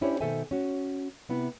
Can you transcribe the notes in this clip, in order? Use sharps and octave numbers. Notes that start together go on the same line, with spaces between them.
C#4 D4 E4 G4 C5 C#5
B2 D#3 A4 C5 E5 G#5
C#4 F#4
C3 B3 E4